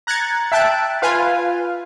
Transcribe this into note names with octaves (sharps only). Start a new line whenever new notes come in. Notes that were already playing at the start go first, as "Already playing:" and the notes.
A#5 F#6 G#6 A6 C#7
E5 G5 A5 F#6 D7
F4 B4 F5 G#5